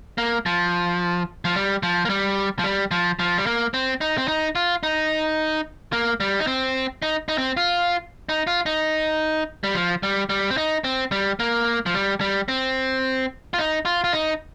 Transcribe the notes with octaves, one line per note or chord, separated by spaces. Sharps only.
A#3
F3
F3
G3
F3
A#3
G3
F3
G3
F3
F3
G3
A#3
C4
D#4
C4
D#4
F4
D#4
A#3
G3
D#4
C4
D#4
D#4
C4
F4
D#4
F4
D#4
G3
F3
G3
G3
C4
D#4
C4
G3
A#3
F3
G3
G3
C4
F4
D#4
F4
F4
D#4